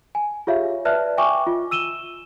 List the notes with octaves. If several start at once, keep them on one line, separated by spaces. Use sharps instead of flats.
G#5
F4 G4 G#4 C#5 E5 F5
B4 D5 E5 A5 F6 F#6
E5 G5 G#5 C#6 D6
F4 D#5
E6 D#7 E7 G7